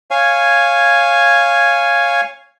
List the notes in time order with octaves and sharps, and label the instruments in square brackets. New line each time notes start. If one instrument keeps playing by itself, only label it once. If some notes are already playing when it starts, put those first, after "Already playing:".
[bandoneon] C#5 F5 G#5